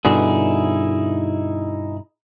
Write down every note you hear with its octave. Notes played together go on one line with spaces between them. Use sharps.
G2 B2 D3 D#4 E4 G#4